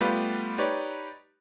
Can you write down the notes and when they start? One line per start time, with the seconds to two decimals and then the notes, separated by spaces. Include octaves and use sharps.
0.01 G3 A3 B3 F4 G4 B4
0.58 D#4 G4 B4 C#5 D5